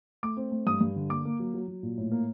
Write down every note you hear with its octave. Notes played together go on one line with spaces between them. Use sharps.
A3 D6
C4
A3
G2 D#6
G2
D3
A#3 D6
A#3
F#3
F#3
F#3
A#2
A2
A#3